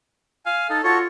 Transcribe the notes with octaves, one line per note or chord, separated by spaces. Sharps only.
F5 G#5
D#4 A4
F4 F#4 A4 C#5